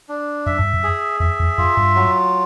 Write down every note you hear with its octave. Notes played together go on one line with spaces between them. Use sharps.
D4
F#2 E5
G2
F#2
G#4
F2 E5
F2
F#2 F4
G2
F#3